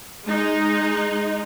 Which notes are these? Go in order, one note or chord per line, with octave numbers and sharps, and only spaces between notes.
G#3 D#4